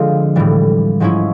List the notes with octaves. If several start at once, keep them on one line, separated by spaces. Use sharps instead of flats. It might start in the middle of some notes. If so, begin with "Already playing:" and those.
Already playing: D3 F3 G#3 C4 F4
A2 E3 G3
G#2 F3 G#3 C#4 E4